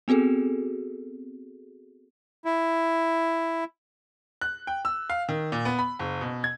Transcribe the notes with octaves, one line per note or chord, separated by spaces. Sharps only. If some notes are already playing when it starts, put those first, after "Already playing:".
B3 C4 F#4 G#4 A4
E4
F#6
G5
E6
F5
D#3
A#2
B3
B5
F#1
B2
G#6